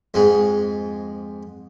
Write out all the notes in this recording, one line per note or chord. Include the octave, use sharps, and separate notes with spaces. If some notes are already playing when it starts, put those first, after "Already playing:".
F2 G#2 G#3